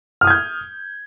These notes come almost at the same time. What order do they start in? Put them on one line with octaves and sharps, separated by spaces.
F6 D#6 G#6 G6